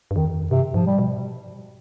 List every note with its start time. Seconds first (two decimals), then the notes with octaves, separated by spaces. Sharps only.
0.11 G2
0.16 F2 D#3
0.51 G2 C3
0.74 G#2 F3
0.86 G3
0.98 B2